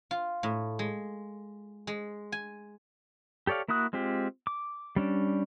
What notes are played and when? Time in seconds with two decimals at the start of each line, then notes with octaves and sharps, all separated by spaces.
0.11 F4
0.43 A2
0.79 G#3
1.87 G#3
2.32 G#5
3.47 G4 A4 C#5 D5 F5
3.68 A#3 E4 F#4 D#6 F#6
3.93 G#3 C4 F4 G4
4.47 D6
4.96 G3 C#4 D4